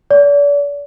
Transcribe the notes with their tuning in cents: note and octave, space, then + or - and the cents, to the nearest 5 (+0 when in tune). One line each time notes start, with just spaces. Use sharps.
D5 -40